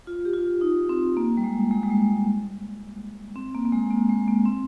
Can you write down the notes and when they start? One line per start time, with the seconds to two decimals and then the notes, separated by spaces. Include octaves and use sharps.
0.07 F4
0.25 G4
0.34 F4
0.61 D#4
0.89 C4
1.17 A#3
1.37 G3
1.44 G#3
1.71 G#3
1.83 G3
1.90 G#3
3.36 C4
3.55 A#3
3.65 A#3
3.72 G#3
3.90 A#3
4.09 G#3
4.28 A#3
4.45 C4